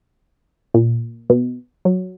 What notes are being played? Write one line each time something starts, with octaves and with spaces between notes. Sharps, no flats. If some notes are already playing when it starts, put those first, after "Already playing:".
A#2
B2
F#3